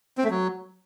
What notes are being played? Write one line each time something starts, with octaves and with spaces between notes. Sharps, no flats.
C4
A3
F#3